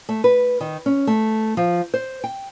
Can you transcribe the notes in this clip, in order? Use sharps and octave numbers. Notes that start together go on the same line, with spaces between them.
A3
B4
D#3
C#4
A3
F3
C5
G5